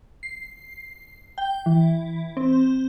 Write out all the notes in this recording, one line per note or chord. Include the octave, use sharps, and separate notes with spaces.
C7
G5
E3
C4